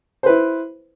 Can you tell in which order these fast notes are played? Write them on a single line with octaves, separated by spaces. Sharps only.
C5 B4 E4